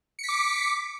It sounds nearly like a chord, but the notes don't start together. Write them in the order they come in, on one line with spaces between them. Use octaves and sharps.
C#7 B6 D6